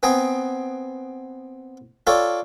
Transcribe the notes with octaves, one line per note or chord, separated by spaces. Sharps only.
B3 C4 G5 G#5 A#5 D#6
F4 A4 C#5 D5 G5